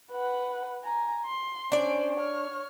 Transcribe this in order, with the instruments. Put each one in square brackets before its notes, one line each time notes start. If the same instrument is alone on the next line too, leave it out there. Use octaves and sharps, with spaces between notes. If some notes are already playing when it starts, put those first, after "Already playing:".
[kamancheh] B4 F#5
G#5 A#5
C6
[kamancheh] C#4 C5 [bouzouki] D4 D5
[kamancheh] C#5 F6